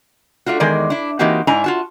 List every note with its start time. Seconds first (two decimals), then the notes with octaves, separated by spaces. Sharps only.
0.46 A3 D4 F4 F#4
0.60 E2 D#3 G#3 A#4 D5
0.90 D4 E4
1.19 E3 A#3 C4 D#4 F#4 G4
1.47 G#2 D4 E4 G#5 A#5
1.64 F4 F#4 A5